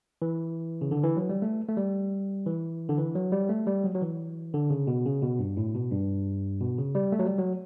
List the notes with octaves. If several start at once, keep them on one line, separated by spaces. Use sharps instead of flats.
E3
C#3
D3
E3
F#3
G3
A3
A3
G3
E3
D3
E3
F#3
G3
A3
G3
F#3
F#3
E3
D3
C#3
B2
C#3
B2
G2
A2
B2
G2
B2
C#3
G3
A3
F#3
G3
F#3